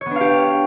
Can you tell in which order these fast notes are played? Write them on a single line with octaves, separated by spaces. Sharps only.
C#5 B3 D4 F5 G4